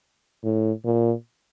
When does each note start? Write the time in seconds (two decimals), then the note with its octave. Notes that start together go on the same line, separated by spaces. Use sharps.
0.44 A2
0.85 A#2